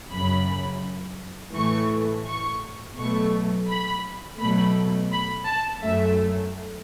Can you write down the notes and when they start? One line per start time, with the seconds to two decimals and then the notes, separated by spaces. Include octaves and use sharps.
0.13 F#2 C#3 F#3 B5
1.55 A2 E3 A3 C#6
2.27 C#6
2.98 B2 F#3 A3 C#6
3.69 B5
4.40 B2 F#3 A3 B5
5.12 B5
5.47 A5
5.83 F#2 F#3 A3 E5